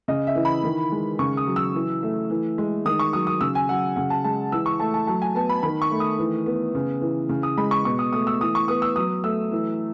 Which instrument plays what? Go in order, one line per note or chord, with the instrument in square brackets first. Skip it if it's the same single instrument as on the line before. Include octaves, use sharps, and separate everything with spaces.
[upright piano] C#3 D#5
E5
E3
B5
D#3
G#3
C#3 C#6
D#6
F#3
E6
E3
A3
E3
G#3
D#3 D#6
C#6
F#3 D#6
D#6
C#3 E6
G#5
F#3 F#5
C#3 F#5
A5
G#3 A5
E3 E6
C#6
A3 A5
A5
F#3 A5
G#5
B3 A5
B5
D#3 B5
C#6
A3
D#6
E3
B3
C#3
E3
C#3
D#6
G#3 B5
C#6
B2 C#6
D#6
A3 D#6
E6
E3 D#6
C#6
B3 D#6
E6
F#3 D#6
A3 E6
E3